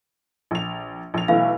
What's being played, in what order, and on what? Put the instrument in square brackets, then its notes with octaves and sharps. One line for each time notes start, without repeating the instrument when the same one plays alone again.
[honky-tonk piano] A#1 F7
A#1 F7
[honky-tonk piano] B1 E3 A3 [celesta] F5